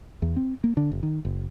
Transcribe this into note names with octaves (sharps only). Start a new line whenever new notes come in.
E2
C4
A#3
D3
F#1
D#3
F#1